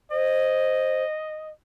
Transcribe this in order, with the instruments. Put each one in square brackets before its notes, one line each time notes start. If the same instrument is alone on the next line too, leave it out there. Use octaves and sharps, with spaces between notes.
[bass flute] C5 [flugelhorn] D#5